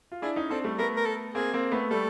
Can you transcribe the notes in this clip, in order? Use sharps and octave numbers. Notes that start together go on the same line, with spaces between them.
F4
D4 E4 G#4
C#4 D#4
C4 D4 A4
G3 A3
A3 B3 A#4
A#4
A4
A#3 C4 G#4
A#3 C4
A3 B3
G3 A3 A4